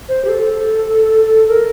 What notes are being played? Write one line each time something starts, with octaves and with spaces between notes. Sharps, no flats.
C5
G4
A4
A#4